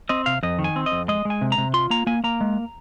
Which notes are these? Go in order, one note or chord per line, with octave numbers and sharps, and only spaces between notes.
C4 D#5
C3 F5
F2 D#5
D#3
G#5
C4
D#5
F2
G#3 D#5
G#3
G#5
C3
A#5
C3
F4 C6
A#3 A#5
A#3 G#5
A#3 A#5
G#3